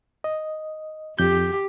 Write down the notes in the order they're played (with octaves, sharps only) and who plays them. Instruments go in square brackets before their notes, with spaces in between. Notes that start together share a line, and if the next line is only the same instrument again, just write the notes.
[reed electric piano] D#5
[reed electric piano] F2 G6 [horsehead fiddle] G4